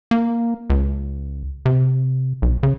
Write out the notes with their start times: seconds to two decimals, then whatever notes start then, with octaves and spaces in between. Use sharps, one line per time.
0.11 A#3
0.70 C#2
1.66 C3
2.42 B1
2.63 C#3